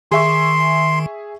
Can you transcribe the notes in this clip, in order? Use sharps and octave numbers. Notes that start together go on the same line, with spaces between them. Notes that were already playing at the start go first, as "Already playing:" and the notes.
D#3 G#4 E5 C6 C#6